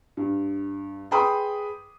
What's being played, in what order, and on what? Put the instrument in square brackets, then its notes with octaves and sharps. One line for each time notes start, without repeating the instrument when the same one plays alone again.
[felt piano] G2
G#4 B4 G5 B5 C6 D#6